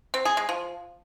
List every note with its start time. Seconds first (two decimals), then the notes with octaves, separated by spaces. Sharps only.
0.14 C4
0.25 G#4
0.37 G#3
0.49 F3